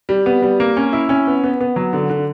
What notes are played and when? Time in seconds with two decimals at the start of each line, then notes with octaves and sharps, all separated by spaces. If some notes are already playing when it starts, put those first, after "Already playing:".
0.09 G3
0.26 B3
0.42 G3
0.60 A#3
0.77 C#4
0.93 E4
1.09 C#4
1.27 B3
1.44 B3
1.61 B3
1.76 F#3
1.93 D3
2.10 D3